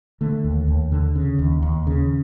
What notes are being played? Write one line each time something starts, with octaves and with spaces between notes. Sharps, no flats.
D3 A3
D#2
D#2
D3
C#3
D#2
D#2
C#3